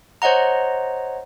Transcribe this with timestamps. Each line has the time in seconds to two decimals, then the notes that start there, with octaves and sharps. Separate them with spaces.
0.22 C5 C#5 D#5 F#5 A#5